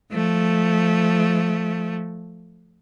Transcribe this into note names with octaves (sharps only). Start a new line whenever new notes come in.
F3 A3